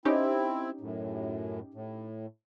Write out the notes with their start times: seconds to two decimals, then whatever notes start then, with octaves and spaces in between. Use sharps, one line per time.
0.05 C4 C#4 D#4 E4 G4
0.81 F#2 A2
1.74 A2